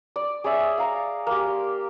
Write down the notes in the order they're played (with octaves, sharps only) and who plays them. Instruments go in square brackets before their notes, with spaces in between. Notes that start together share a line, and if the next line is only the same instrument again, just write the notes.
[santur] D5
G#4 C#5 D5 E5
F5 A#5
A#3 G4
C6